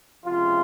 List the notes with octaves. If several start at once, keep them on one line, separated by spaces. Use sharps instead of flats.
C#2 C3 F3 F4